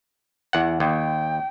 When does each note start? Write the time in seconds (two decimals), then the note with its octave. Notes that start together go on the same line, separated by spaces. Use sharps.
0.53 E2 F#5
0.80 D#2 G5